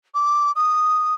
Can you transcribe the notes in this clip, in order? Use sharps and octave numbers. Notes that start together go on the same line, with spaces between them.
D6
D#6